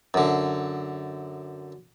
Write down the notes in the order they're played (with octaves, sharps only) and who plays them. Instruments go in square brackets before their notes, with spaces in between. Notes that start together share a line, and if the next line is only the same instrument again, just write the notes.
[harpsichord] F#2 D3